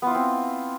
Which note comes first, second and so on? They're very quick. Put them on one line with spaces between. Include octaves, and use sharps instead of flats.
B3 F4 E4 C4